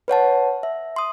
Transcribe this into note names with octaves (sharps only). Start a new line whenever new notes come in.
B4 C#5 F#5 A5
E5
C6 D#6